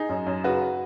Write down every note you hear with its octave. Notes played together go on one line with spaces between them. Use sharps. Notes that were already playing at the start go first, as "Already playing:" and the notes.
Already playing: D#4 G#4
F#2
F#2
C#3 F#4 B4